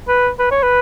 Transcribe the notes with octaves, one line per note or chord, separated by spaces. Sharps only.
B4
B4
C#5
B4